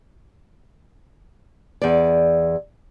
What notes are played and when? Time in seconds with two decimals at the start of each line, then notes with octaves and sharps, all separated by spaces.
1.82 E2 D5